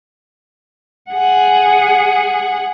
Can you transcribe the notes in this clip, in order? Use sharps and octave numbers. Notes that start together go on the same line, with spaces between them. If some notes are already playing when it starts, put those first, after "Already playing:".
G#4 F#5